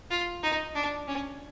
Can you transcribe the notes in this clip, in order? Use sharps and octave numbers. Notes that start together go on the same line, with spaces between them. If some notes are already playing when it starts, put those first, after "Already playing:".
F4
D#4
D4
C#4